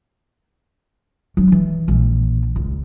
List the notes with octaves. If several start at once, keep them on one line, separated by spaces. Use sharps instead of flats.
F#3 D4
E3
A#1 E3
C#2